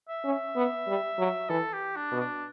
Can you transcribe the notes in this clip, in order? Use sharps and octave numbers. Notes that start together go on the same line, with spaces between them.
E5
C#4
E5
B3
G3
F#3
E3 A4
G4
D4
B2
D4